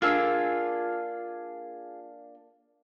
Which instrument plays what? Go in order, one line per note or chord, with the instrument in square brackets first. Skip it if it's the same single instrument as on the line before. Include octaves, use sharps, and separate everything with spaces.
[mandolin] A#3 D4 E6 [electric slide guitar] F4 G#4